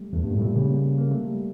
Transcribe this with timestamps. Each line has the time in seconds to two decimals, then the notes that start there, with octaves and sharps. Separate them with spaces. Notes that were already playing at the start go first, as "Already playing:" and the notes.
Already playing: G3 A3
0.13 E2 A3
0.24 G2
0.27 A#3
0.34 A2
0.37 G3
0.41 A#2 A3
0.56 C#3 G3
0.70 A#3
0.98 A#3
1.11 A3
1.26 G3